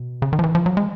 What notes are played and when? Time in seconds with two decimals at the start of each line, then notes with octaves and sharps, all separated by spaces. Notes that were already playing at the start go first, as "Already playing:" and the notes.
Already playing: B2
0.22 C#3
0.33 D#3
0.39 F3
0.44 E3
0.55 F3
0.66 F#3
0.77 G#3